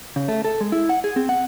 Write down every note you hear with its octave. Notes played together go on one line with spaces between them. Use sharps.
C#3
A3
A4
G#3
E4
F#5
G#4
C4
F#5